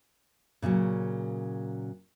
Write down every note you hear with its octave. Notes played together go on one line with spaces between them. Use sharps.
A#2 C#3 F3 F#3